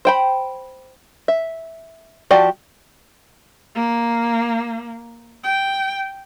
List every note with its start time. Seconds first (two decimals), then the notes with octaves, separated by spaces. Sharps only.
0.05 C5 G5 B5
1.28 E5
2.31 F3 F#4 G4 D5 A5
3.75 A#3
5.43 G5